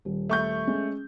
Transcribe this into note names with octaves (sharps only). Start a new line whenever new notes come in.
D#1
A3 C#6 G6
G#3 C#4